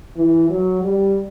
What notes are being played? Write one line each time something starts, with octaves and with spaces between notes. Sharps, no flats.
E3
F#3
G3